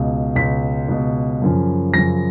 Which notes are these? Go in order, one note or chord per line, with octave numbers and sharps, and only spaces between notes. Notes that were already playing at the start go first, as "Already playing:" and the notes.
Already playing: C#2 B2
C#2 B2 B6
C#2 B2
F#2 C#3 F3
F#2 C#3 F3 A#6